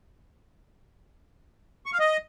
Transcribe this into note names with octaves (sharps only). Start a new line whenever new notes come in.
C#6
F5
D#5